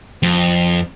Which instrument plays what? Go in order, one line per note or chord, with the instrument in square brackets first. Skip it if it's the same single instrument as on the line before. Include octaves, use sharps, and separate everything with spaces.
[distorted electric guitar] F2